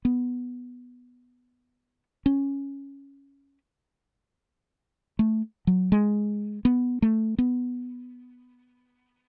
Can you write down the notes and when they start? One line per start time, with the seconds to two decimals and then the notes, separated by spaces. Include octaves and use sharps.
0.05 B3
2.26 C#4
5.19 A3
5.67 F#3
5.92 G#3
6.65 B3
7.02 A3
7.38 B3